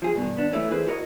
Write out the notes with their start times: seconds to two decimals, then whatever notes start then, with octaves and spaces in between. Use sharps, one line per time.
0.02 F3 G#4
0.16 G2 B2 D#3
0.37 B3 D4
0.52 E3 A3 C#4
0.71 D2 E4 G#4 B4 C5
0.87 E4 F#4 A#4 D5 D#5